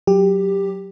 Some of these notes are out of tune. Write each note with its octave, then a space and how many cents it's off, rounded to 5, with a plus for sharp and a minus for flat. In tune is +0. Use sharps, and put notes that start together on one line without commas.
F#3 +0 G4 +10